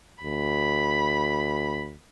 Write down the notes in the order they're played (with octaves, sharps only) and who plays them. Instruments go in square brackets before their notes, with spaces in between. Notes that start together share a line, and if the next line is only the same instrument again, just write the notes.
[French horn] D2 [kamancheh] B5